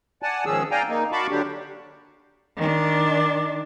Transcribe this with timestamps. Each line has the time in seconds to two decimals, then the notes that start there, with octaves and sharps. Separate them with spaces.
0.22 D5 F#5 G#5 A5
0.46 G#2 D#3 F3 C#4 G#4 E6
0.71 D5 F5 G5 G#5 A#5
0.89 A#3 D#4
1.12 F#4 F5 A5 B5 C#6 D6
1.30 D3 F#3 D4 G4
2.57 D#3 D4